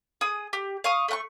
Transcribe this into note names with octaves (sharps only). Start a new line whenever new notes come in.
G#4 D#6
G4
F5 C#6 D#6
A3 F#5 C#6